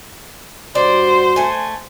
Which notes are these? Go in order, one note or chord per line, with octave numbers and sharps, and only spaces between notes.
G2 F#4 C5 D5
A3 G#5